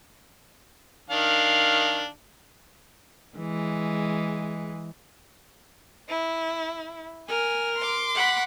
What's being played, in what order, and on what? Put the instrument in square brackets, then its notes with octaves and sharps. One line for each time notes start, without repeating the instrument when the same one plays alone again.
[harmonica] D#3 D4 F5
[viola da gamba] E3 G#3
[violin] E4
[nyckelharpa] A#4 [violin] G#5
[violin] C6 D6
[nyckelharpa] F#5 B5